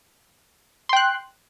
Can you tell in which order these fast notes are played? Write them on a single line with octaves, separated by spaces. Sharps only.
C6 G5 F#6